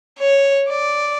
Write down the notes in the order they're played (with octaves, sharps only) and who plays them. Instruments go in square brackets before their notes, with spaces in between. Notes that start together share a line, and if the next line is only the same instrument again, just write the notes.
[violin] C#5
D5